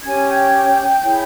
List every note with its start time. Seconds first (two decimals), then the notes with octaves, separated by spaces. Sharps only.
0.04 C#4 G4 C#5 G#5 G#6
0.28 G5 G6
1.02 E4 G#4 C#5